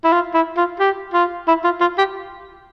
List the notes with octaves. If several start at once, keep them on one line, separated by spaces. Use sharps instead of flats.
E4
F4
E4
F4
G4
F4
E4
F4
F4
G4